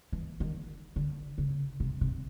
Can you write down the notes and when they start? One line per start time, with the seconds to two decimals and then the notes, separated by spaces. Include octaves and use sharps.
0.12 E3
0.40 D#3
0.96 D3
1.38 C#3
1.80 C3
2.01 C3